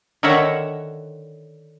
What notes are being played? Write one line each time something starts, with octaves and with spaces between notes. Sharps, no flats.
D3 D#3 A#4 C#5 E5 F#5